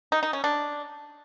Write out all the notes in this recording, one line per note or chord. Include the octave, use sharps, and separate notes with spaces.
D#4
D#4
C#4
D4